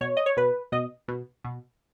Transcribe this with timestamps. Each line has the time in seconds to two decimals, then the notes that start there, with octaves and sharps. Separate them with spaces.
0.01 B2 C#5
0.17 D#5
0.26 C#5
0.37 B2 B4
0.72 B2 D#5
1.08 B2
1.44 B2